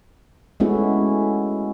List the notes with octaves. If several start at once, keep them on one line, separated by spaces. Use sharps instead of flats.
G#3 A3 B3 C#4 E4 F#4